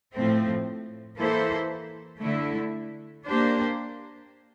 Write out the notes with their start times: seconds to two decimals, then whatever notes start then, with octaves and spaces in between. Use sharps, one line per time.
0.14 A2 F3 A3 C4
1.17 E3 A#3 E4 A4 C5
2.21 D3 A3 E4
3.26 A#3 D4 G4 C5